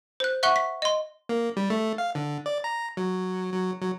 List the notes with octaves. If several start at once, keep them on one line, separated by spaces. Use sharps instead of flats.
C5 F#6
E5 F#5 C#6 F#6 G7
B6
D#5 C6
A#3
G3
A3
F5
D3
D5
A#5
F#3
F#3
F#3